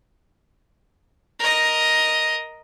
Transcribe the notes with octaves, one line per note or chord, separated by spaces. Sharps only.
A#4 D#5